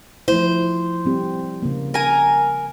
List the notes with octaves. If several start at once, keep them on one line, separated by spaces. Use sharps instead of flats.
F3 A3 E4 C5
G3 C4 G4
C#3 A#3
A#4 G#5